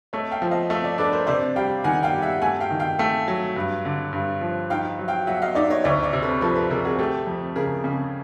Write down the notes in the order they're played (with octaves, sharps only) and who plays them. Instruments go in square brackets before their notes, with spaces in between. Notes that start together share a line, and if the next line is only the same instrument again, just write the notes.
[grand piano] A3 [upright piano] C#5 D#5
[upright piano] F5 G5
[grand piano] F3
[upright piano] D#5 F5
[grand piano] A3 [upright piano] D#5 F5
[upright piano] D5 E5
[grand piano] D4 [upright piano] A4 B4
[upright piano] A#4 C5
[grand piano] C3 [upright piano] C5 D5
[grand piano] G3 [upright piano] F5 G5
[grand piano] D#3 [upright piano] F#5 G#5
[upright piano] F5 G5
[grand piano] G3
[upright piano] E5 F#5
[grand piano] A3 [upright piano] F#5 G#5
[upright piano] F5 G5
[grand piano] D#3
[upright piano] F5 G5
[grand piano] A3 [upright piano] F5 G5
[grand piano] F#3
G2
D3
G2
F3
[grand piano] D#4 [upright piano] F5 G5
[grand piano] F#3
[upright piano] F5 G5
[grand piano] F#3 [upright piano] E5 F#5
[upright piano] D#5 F5
[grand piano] D#4 [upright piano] D5 E5
[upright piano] C#5 D#5
[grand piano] D2 [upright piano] D5 E5
[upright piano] D5 E5
[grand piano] C3
[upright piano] A4 B4
[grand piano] F3 [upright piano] A4 B4
[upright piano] A4 B4
[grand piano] C3 [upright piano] G#4 A#4
[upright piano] F#4 G#4
[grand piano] A3 [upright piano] G4 A4
[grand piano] F2
[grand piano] C#3 [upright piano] G#4 A#4
[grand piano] C#3